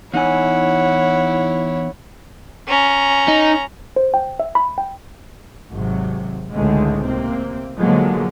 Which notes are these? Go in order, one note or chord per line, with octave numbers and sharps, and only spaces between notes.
E2 D#4 E4 C#5 F#5 G#5
C#4 A#5
D#4
C5
G5
E5
B5
G5
G#1 C3 F#3
C#2 A2 D3 D#3 G#3 A3
C3 A#3 C4
B2 D3 F3 F#3 G#3 A#3